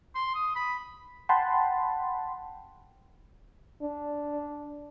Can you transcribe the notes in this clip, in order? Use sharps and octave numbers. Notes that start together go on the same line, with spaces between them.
C6
D#6
B5
F#5 G5 A5 B5 C6
D4